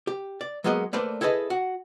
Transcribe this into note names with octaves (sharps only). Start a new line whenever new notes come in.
G4
D5
F#3 G#3 A#3 B3 F#4 D#5
A3 A#3 B4 C5 D5
E4 G#4 A4 B4 C#5 D#5
F#4